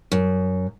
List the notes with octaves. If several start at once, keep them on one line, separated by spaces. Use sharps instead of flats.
F#2